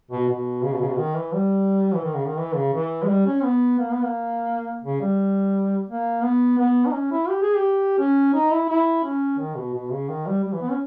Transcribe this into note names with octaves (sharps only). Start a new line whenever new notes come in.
B2
B2
C#3
B2
C#3
B2
D#3
E3
G3
E3
D#3
C#3
D#3
E3
C#3
E3
G#3
G3
C#4
B3
A#3
B3
A#3
C#3
G3
A#3
B3
B3
D#4
C#4
E4
G4
G#4
G4
C#4
D#4
E4
E4
C#4
D#3
B2
B2
C#3
D#3
G3
G3
E3
B3
C#4